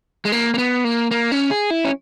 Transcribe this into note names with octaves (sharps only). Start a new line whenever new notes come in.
G#3
A#3
A#3
B3
A#3
A#3
C#4
G#4
E4
C#4